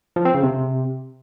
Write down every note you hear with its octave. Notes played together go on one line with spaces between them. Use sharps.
F3
C4
C#3
C3